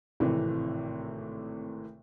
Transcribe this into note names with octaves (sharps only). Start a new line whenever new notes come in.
G#1 A2 C3 E3